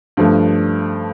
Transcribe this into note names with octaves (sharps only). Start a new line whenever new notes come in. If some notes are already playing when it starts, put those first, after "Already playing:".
G2 F3 A3